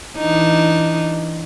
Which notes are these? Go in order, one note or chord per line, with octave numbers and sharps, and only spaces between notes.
E3 D4 D#4